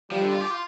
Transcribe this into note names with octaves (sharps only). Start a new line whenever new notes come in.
F3 G3
D3
F4
G4
F4